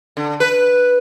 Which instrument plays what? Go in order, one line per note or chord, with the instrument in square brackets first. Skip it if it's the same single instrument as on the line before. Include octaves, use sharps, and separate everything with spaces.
[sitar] D3
B4